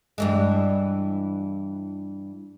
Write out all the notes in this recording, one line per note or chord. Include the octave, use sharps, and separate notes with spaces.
G2 E3 G#3